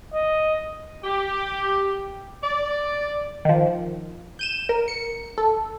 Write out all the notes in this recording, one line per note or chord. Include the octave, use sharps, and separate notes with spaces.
D#5
G4
D5
D#3 F3
G6 D#7 E7
A#4
C#7
A4